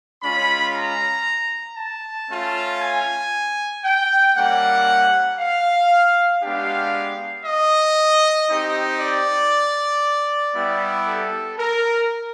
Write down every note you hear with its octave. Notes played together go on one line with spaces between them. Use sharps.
G#3 C#4 F4 B5
A#5
A5
A3 C#4 F4
G#5
G5
G3 A#3 C#4 F#5
F5
G#3 B3 D4 G4 F5
D#5
C4 D#4 G4
D5
G3 B3 E4 G4
A4
A#4